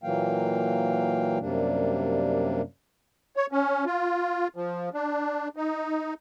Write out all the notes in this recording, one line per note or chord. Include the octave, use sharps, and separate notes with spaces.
A#2 E3 F#3 A#3 F5 G5
F#2 C3 G3 A#3 D4
C#5
C#4
F4
F3
D4
D#4